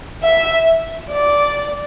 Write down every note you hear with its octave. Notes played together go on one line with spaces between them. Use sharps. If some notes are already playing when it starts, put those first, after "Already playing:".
E5
D5